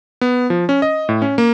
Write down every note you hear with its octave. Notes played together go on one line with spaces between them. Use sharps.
B3
F3
C#4
D#5
A2
C#4
A#3